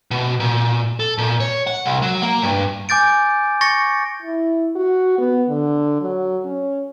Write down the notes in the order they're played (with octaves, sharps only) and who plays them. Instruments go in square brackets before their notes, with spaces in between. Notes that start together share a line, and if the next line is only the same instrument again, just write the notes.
[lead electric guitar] B2
A#2
A4
A#2
C#5
F#5
C2
F#3
A#3
G2
[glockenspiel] G#5 D6 G6 A6 D7
C#6 A6 A#6 C#7
[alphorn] E4
F#4
B3
D3
F#3
C#4